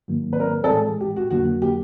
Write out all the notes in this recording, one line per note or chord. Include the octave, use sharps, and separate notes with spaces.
G#2 D#3 F#3 A#3
B4
A#4
A4
A2 E3 G#3 G#4
G4
F#4
F2 D3 F#3 A#3 D4 F#4
G4